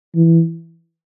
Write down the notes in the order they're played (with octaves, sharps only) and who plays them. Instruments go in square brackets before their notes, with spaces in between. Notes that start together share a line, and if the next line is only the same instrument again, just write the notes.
[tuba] E3